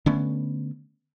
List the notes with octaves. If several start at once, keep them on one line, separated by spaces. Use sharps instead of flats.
D3 A3 B3 C#4